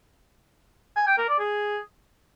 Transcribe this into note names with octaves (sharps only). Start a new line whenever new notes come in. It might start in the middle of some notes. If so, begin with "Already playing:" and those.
G#5
G5
A#4
D5
G#4